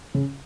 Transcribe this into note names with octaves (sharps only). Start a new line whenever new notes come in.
C#3